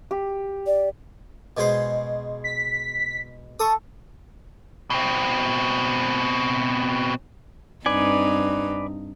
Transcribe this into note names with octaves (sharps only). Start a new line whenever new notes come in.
G4
D5
B2 G#3 C5
B6
A4 C#6 D#6
B2 C4
G2 C4 D#4 B4 D5 G#5